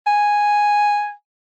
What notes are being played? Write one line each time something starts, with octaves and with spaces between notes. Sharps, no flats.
G#5